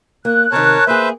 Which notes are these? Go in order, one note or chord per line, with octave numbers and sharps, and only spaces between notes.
A#3 F#6
C3 D#3 A#4 C#5 A5
A#3 G#4 B4 C5 E5